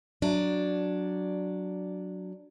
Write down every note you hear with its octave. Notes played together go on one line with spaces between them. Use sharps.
F#3 D4